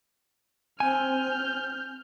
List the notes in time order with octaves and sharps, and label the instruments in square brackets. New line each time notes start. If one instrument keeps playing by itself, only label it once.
[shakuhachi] C4 [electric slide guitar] G#5 [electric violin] F6 G6